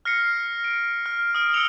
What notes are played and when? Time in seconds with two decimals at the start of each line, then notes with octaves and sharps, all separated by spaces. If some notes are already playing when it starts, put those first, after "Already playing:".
0.05 F6 A#6 C7 C#7
0.64 D7
1.06 F6
1.35 D#6 F6 D7
1.53 E6 C#7 D7 F7 G7